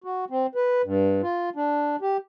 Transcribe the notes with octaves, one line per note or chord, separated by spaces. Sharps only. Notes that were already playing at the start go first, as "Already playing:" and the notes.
F#4
C4
B4
G2
F4
D4
G4